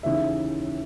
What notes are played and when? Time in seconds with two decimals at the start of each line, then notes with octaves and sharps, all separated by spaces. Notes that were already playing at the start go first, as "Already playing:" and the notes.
0.03 D#2 C#3 E3 E5